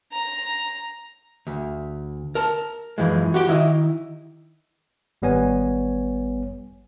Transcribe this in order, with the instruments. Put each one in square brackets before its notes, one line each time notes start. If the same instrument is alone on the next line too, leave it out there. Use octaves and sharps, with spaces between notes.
[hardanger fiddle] A#5
[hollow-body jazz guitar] D2
A#4 A5
F#2 E3 F3 G#3
F#4 G4 G5
D#3 E4 D#5
[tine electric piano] G#1 G3 B3 C#5 G#5